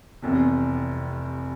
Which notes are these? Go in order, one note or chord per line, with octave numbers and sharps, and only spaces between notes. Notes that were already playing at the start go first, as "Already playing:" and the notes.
F1 E2 C3